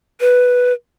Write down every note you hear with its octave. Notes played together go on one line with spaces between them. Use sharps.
B4